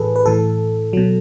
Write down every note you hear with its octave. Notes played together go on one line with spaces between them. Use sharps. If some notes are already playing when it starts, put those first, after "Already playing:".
Already playing: A2 E3 G#4 A4 B4
B4
A2 E3 A4
B2 F#3